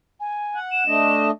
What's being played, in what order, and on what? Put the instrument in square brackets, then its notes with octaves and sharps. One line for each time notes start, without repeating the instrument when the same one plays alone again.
[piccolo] G#5
[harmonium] F#5
[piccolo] E7
[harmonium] A3 D4 D#5